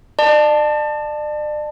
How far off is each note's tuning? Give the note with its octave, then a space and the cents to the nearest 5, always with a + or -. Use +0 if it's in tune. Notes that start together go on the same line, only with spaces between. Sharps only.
D5 +40 A5 +0